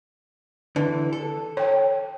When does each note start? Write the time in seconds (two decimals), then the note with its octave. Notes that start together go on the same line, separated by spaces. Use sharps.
0.76 D3 E3
1.13 A4
1.57 C#5 G5